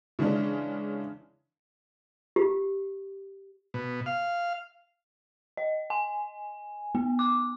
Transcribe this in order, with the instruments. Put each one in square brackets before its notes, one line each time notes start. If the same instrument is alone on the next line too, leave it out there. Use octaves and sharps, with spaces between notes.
[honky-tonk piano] C#3 E3 G#3 C#4 D4
[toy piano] G4
[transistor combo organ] B2
F5
[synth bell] D#5
G#5
B3
D6